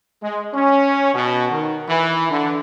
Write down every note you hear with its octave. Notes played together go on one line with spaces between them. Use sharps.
G#3
C#4
B2
D#3
E3
D3